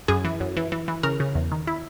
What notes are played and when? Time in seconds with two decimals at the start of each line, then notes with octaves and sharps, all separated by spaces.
0.08 F#2 G#4
0.25 E3
0.40 F#2
0.57 E3
0.72 E3
0.88 E3
1.03 C#3 A#4
1.20 C#3
1.35 E2
1.52 D#3
1.67 E4